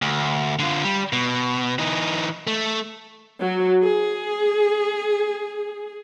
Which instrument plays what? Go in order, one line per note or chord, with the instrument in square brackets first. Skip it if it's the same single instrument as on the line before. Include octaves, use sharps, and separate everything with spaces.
[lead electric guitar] D2
D3 F4
G3
B2
E3 D#4
A3
[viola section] F#3
G#4